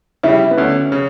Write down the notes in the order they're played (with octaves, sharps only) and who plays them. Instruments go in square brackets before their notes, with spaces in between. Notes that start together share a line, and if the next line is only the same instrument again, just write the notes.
[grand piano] C#3 G3 [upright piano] E4
[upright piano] B3
[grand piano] D2 [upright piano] C#4
[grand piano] C#3